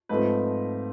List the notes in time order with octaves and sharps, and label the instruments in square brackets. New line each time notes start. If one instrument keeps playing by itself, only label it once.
[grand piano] G#2 F3 A3 C4 B4